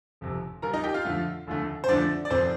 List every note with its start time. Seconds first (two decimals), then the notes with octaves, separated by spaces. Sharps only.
0.21 G1 F2 C3
0.62 D#2 D#3 G3 A#4 A#5
0.73 D#4 D#5
0.84 G4 G5
0.94 F4 F5
1.05 F2 D3 A3
1.47 F1 D#2 D3 A3
1.84 C5
1.88 F2 D3 F3 A3 D4 D5
2.25 D5
2.30 F1 F2 D#3 C4 C5